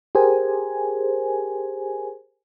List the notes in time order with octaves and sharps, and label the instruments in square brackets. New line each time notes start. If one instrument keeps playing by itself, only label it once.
[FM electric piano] G4 G#4 A#4 C5 G#5